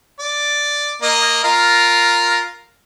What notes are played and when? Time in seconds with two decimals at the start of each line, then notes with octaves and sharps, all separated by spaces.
0.20 D5
1.02 A#3 D#5
1.44 F4 A#4